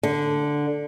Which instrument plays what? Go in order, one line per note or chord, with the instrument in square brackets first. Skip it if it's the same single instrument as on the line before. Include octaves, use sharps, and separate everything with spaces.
[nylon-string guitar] D3